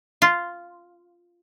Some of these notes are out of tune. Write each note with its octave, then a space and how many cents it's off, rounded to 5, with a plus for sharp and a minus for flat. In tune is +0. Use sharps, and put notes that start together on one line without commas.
F4 -5